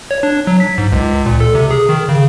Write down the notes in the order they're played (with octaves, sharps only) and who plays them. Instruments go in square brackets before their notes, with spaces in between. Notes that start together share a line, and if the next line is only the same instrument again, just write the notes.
[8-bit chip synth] C#5
D4
F#3
B6
G#2
C#2
A#2
A4
C3
G#4
D#3
C#3